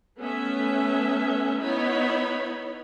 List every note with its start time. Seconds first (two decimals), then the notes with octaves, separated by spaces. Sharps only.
0.17 A3 B3 C#4 E5
1.60 B3 D#4 E4 C#5 B5